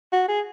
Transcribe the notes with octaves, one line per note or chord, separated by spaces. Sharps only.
F#4
G#4